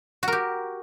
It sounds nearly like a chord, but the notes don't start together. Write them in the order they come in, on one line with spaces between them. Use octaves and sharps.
F#4 A#4 G4